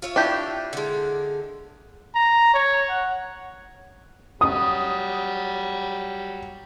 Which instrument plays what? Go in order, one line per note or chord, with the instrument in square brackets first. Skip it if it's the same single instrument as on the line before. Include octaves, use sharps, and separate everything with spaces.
[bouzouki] F4 C#5 E5
[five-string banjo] D4 E4 G4
[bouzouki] D3 G#3
[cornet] A#5
C#5
F#5
[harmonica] F#3 G3 [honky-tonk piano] D#6